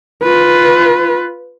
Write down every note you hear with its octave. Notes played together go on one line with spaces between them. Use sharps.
F4 B4